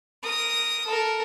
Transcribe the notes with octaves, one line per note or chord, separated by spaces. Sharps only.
A#4 D#6
A4 A#4